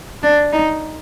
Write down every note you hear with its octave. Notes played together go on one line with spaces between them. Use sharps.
D4
D#4